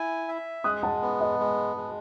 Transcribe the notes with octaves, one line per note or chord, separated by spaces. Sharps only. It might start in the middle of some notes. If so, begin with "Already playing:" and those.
Already playing: E4 G#5
E5
G#3 D#6 F#6
F#5 A5
B3
D#5 F#5
G#3
G#3